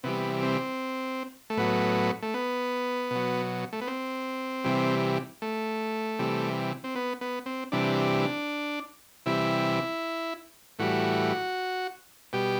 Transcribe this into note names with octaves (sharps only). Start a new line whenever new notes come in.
C3 E3 G3 B3
C4
A3
A2 F#3 B3
A3
B3
B2 F#3
A3
B3
C4
C3 E3 G3
A3
C3 E3 G3
C4
B3
B3
C4
C3 E3 G3 D4
C3 E3 G3 E4
A2 E3 G3 F#4
B2 G3 G4